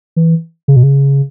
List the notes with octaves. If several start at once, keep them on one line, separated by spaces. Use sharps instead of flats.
E3
C#3
B2
C#3